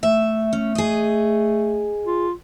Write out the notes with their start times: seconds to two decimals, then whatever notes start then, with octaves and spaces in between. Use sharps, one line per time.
0.03 A3 E5
0.53 C#4
0.75 G#4 D#5
2.05 F4